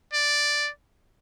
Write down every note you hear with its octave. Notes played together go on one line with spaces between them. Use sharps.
D5